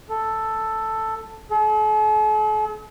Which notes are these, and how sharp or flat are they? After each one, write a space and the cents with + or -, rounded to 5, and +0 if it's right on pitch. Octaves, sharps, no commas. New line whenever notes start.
A4 +5
A4 -45